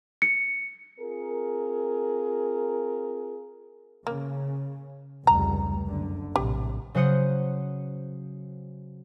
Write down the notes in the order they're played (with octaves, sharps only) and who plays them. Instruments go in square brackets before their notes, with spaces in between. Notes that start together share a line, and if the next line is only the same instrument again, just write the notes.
[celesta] C#7
[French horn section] C4 F4 G#4 A#4
[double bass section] C#3 [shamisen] A#3
[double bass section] F1 C#2 G3 [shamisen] A#5
[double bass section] F#1 D3
[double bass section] A#1 A2 C3 [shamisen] G4
[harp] C#3 F#3 C5 F#5 D#6 C#7